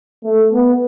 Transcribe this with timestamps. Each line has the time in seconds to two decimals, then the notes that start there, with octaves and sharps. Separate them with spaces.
0.24 A3
0.52 B3